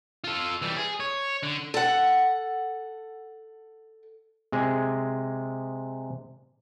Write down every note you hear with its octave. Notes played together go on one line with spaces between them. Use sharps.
F4 A4
E3 G3
G#4
C#5
D3
A4 F#5
C3 G#3 G#4